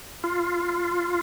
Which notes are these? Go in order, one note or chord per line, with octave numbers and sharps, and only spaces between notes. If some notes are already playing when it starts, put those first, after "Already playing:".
F4